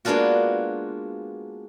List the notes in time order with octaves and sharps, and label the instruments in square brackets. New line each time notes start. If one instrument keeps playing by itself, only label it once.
[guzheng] G#3 A#3 B3 D4 F4 F#4